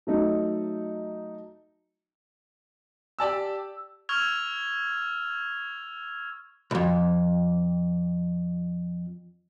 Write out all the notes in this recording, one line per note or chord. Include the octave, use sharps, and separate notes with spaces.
F#3 A3 D#4
G4 D5 A5 E6
C#6 E6 F6 G#6 F7
B1 F2